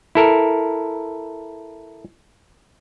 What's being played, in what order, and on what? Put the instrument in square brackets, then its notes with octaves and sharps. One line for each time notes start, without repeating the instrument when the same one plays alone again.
[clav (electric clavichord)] E4 A4 A#4